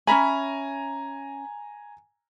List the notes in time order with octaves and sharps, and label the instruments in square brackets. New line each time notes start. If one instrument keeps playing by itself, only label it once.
[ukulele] C#4 E5 B5 [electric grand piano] G#5 A#5